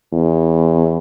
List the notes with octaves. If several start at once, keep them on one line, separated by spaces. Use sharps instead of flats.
E2